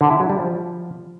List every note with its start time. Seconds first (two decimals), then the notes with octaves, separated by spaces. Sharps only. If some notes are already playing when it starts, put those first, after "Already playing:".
0.01 D3
0.10 E4
0.20 F#3
0.30 G3
0.39 F3